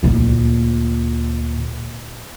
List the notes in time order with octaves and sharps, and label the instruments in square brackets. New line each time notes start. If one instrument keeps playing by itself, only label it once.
[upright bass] D2 A#2